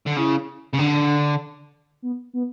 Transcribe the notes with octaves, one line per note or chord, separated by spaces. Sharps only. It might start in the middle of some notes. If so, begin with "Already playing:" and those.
D3
C#3 E4
C#3
D3 D4
B3
B3